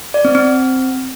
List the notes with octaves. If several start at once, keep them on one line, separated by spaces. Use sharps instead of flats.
D5
C4
C4